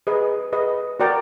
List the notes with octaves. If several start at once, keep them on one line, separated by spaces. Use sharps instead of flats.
G#4 B4 D#5
G#4 B4 D#5
F#4 A#4 D5 G5 A#5